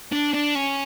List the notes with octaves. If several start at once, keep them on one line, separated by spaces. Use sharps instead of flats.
D4
D4
C#4